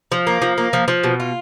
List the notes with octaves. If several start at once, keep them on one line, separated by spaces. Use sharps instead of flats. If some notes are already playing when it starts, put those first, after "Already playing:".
F3
A#3
F3
A#3
F3
F3
B2
F4